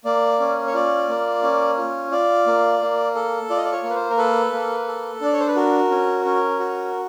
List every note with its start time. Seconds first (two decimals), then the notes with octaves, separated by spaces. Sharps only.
0.05 A#3 D5
0.40 C#4
0.67 C#5
0.74 F4 D5
1.09 A#3
1.42 C#4
1.77 F4
2.11 F4 D5
2.47 A#3
2.81 A#3
3.15 A4
3.50 F4 D5
3.57 D#5
3.65 D5
3.72 C#5
3.83 A#3
3.90 B4
3.96 C5
4.10 A#4
4.18 A4 B4
4.53 A#3
4.88 A4
5.21 D4 D5
5.33 C#5
5.40 C5
5.48 B4
5.56 F#4 A#4
5.91 C#4
6.25 C#4
6.60 F#4